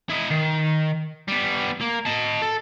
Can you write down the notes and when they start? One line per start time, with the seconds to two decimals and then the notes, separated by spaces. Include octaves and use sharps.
0.10 E4 D#5
0.31 D#3
1.28 G3 B3
1.81 A#3
2.05 D#5 A5
2.42 A4